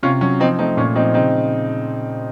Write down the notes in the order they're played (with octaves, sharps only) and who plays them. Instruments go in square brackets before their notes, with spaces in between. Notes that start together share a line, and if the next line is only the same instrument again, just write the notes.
[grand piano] C3 C#4 F4
F#3 C#4
F3 C4 D#4
A3 C4 D#4
A#2 C#4
F3 C4 D#4
C#3 C4 D#4